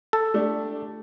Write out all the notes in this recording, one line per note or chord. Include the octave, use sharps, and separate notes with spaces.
A4
A3 D4 G4